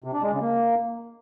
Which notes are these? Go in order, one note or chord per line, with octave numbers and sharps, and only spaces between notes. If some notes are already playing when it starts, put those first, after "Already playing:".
C3
D4
G#3
C#3
A#3